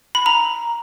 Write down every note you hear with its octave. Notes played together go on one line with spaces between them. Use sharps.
B5
A#5